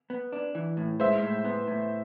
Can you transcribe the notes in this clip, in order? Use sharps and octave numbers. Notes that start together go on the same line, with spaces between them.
B3
D4
E3
A2
G#3 C5 E5
A2
B3
A2